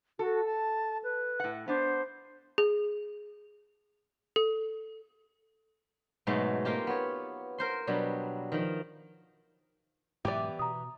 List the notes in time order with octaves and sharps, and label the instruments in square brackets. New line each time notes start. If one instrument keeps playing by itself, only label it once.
[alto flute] F#4 [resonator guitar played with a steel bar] A4
[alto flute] A5
B4
[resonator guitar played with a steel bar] A2 F#5
[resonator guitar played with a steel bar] B3 D4 [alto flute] C5
[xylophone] G#4
A4
[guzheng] G#2 B2 F#3 G#3 A3
A#3 C4 F4 G4
B3 C#5
A#4 C5 C6
B2 F#3 G3 D4
D#3 F3
[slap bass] G#2 B2 F#3 [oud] E3 B3 [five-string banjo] G4 D5
[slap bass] B2 [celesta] A#5 D#6